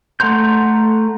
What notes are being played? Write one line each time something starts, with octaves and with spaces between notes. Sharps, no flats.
A3 F#5 A#5 C6 G6